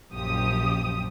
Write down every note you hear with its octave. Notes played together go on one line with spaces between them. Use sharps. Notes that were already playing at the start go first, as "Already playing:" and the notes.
A#1 F#2 F3 G4 D#6